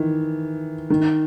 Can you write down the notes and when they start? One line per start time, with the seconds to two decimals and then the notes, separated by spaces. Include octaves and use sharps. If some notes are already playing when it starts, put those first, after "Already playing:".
Already playing: D#3 E3
0.90 D#3